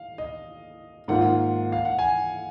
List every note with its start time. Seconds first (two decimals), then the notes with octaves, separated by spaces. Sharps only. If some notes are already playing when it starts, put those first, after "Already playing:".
Already playing: F5
0.18 D#5
1.08 G#2 D#3 A#3 F4 F#5
1.72 F5
1.85 F#5
1.99 G#5